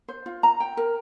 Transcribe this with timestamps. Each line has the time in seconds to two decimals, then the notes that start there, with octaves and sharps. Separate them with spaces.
0.08 C5
0.26 F4
0.43 A#5
0.60 G5
0.77 A#4